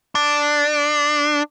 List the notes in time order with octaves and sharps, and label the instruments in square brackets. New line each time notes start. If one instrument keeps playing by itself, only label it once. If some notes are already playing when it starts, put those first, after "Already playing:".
[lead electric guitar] D4